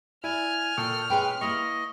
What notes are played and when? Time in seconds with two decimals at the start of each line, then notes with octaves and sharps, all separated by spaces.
0.24 E4 D5 G#5 F6
0.78 A#2 A4 G5 C#6 D#6
1.10 G#3 C#4 G#4 B4 G5
1.41 A#3 E4 B4 D#5 C#6